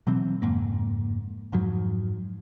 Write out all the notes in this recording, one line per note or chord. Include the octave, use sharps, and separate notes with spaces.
B2 E3 F#3 C4
F#1 F2 G#2 A#3
F2 G#2 F3 F#3